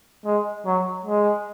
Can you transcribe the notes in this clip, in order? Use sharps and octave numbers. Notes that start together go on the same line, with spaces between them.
G#3
F#3
G#3